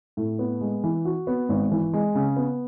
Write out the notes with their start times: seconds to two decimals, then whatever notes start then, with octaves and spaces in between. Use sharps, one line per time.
0.17 A2
0.39 B3
0.61 G#3
0.84 E3
1.05 F#4
1.27 B3
1.49 G#1
1.72 E3
1.93 G#3
2.15 C#3
2.36 B3